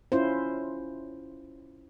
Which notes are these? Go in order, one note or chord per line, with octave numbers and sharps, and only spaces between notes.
C#4 E4 F4 C5